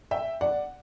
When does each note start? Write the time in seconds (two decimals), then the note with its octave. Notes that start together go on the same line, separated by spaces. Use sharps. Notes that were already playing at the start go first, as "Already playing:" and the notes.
0.11 E5 G5
0.41 D5 F#5